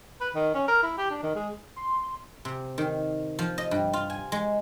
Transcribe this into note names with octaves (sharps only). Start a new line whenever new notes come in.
B4
D#3
C#4
A#4
E4
G4
D4
D#3
G#3
C6
C3
D#3
F3
D#5
G2
F4
G#5
G#3